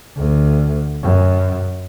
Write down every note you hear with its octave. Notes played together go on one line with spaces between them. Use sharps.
D2
F#2